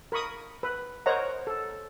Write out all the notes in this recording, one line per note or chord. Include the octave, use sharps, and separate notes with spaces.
A#4 B5 C#6 D#6
B4
A#4 C5 C#5 D#5 F#5 A#5
A4